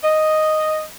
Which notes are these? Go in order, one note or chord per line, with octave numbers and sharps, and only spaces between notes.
D#5